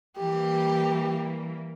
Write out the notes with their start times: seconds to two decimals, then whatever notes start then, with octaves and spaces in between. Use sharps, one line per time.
0.17 E3 G3 A#3 G4